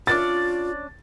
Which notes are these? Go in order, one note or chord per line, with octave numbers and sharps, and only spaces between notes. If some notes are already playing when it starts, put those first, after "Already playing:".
C#4 D4 F4 D5 A6